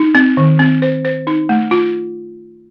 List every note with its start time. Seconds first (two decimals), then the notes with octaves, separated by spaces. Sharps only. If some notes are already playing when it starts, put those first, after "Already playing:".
Already playing: D#4
0.15 C4
0.37 D#3
0.59 C4
0.82 C5
1.05 C5
1.27 D#4
1.49 A3
1.71 F4